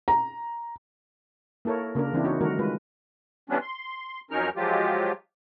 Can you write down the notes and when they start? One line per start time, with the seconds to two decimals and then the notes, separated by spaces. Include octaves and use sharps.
0.08 A#5
1.65 A#3 E4 A4 A#4 C#5
1.95 C#3 A#3 D4 A#4
2.13 E3 C4 D4 E4
2.24 D#4 F#4 C#5
2.41 D#3 G3 A3 F#4 A#4
2.59 G#3 F4 B4
3.50 E3 G3 B3 C#4 D4
3.62 C6
4.31 F2 F#3 C#4 D#4 A#4 F6
4.56 F3 F#3 G#3 F4 G4